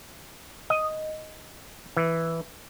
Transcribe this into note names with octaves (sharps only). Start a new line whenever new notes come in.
D#5
E3